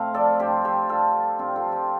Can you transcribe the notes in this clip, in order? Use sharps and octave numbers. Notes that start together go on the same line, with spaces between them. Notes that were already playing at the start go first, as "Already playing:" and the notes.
Already playing: A2 A3 C4 F5
F3 A4 D5
G2 G4 C5
F3 G4 C5
G2 F4 A4
F3
G2 C4 F4
F4 A4
F3
G4 C5